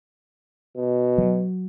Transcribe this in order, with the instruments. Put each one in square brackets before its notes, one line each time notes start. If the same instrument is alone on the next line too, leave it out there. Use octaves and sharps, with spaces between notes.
[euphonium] B2
[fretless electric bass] F#3